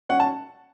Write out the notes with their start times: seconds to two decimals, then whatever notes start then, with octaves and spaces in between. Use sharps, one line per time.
0.09 C#4 F#5
0.20 A5